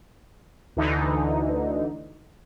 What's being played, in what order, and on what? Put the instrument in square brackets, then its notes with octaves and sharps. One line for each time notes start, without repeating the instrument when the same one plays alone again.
[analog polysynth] D2 D3 E3 D#4